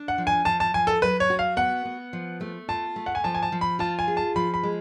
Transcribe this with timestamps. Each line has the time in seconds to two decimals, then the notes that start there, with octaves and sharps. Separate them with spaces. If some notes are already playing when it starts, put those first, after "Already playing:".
Already playing: D4
0.08 F#5
0.18 F3
0.27 G#5
0.45 F3 A5
0.60 A5
0.74 F3 G#5
0.87 A4
1.02 F#3 B4
1.20 C#5
1.30 F#4
1.39 F5
1.57 B3 F#5
1.85 B3
2.13 F3
2.41 A3
2.68 F4 A5
2.96 A3
3.06 F#5
3.15 G#5
3.24 F3 A5
3.34 G#5
3.43 A5
3.52 F3
3.61 B5
3.79 F4 A5
3.99 G#5
4.08 G#4
4.17 A5
4.36 F3 B5
4.54 B5
4.63 G#3